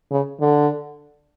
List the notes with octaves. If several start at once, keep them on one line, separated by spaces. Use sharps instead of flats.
C#3
D3